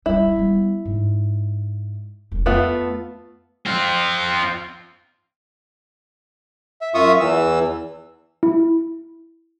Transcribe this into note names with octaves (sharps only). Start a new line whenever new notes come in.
G3 C4 E4
G3 B3
G#2
E1 G#2
F2 A3 B3 F4
C4 F4
E5
F#2 F4 E5 C#6 D#6
E2 E3 E6
E4